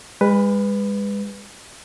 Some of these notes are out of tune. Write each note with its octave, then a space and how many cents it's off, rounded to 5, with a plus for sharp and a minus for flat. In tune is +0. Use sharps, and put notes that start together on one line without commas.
G#3 -40 B4 +5